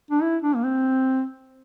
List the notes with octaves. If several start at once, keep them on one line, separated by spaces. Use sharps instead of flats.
D4
E4
D4
A#3
C4